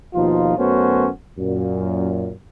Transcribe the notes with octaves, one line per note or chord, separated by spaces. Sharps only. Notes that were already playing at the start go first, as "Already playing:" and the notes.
D#2 B2 F3 D#4 F4
F#2 A3 B3 C#4 F#4 C5
F#2 A#2